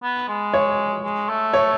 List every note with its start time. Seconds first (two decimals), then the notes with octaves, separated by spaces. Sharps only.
0.03 B3
0.28 G#3
0.54 C#5
1.03 G#3
1.29 A3
1.54 C#5